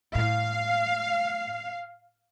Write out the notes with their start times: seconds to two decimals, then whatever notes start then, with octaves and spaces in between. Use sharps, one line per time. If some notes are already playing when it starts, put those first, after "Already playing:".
0.15 A2 F5